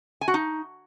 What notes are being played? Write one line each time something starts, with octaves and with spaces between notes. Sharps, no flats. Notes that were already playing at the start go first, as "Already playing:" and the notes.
G#5
F#4
D#4